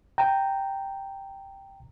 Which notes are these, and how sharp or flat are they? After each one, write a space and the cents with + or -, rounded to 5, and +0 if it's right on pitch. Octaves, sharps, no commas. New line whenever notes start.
G5 +0 A#5 -15